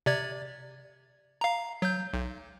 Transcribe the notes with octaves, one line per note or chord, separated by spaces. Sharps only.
C3 D5 G#6
F5 A#5
F#3 G6
B1